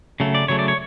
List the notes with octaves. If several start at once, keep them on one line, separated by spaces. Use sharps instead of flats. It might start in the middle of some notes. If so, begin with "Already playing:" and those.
C#3 F#3 A3
D5
C#3 F#3 A3 C#5
D5
C#5